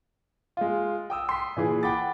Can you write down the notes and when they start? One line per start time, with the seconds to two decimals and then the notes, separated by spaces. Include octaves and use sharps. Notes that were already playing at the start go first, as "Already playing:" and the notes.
0.57 G#3 F4
1.10 G5 D#6 E6
1.29 C6 B6
1.57 A#2 E3 G#4
1.83 F#5 G5 B5 D6 A6